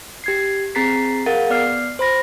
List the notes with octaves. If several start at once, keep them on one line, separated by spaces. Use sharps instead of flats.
G4 G#6 C7
C4 G#4 A#5 A6 B6 C7
G#4 A#4 F5 F#5 A6
B3 D5 F6 C7
C5 B5 A#6